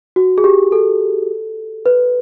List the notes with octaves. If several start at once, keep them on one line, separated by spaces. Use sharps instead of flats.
F#4
G#4
G4
A4
B4